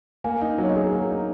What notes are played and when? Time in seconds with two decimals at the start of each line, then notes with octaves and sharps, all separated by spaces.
0.24 A#3 G#5
0.41 D#4
0.58 F#3
0.64 C#5
0.70 D#5
0.76 G#4
0.93 A#3
1.10 D#4